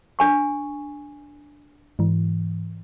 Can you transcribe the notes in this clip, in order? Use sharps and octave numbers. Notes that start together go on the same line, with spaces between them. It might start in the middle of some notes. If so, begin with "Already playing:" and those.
D4 G#5 C#6
G#2 E3